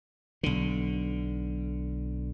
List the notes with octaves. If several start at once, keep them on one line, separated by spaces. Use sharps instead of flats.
B1 D3